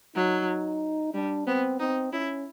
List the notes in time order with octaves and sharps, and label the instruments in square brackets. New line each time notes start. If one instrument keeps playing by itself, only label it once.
[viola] F#3 [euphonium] D#4
[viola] G3 [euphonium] D4
[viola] B3 [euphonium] C4
[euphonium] C4 [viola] D#4
[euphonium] C#4 [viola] E4